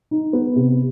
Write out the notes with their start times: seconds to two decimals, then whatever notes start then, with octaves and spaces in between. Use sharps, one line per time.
0.11 D#4
0.33 B3
0.56 C3